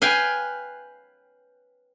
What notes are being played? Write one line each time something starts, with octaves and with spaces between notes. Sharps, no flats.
B4 F5 G5 G#5